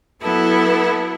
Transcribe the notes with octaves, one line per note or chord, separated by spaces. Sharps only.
F#3 B3 E4 A4